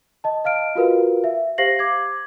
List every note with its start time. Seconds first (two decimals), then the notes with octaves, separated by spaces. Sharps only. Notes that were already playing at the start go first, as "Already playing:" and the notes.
0.24 D#5 A5
0.44 D#5 F5 F6 D7
0.75 F4 F#4 A#4 B4 F5
1.24 E5
1.58 G4 C5 F5 A#6 C7 F#7
1.79 D6 G#6